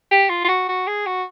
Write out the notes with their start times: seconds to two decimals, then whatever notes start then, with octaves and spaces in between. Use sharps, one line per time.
0.11 G4
0.30 F4
0.44 F4
0.48 F#4
0.68 F#4
0.87 G#4
1.06 F#4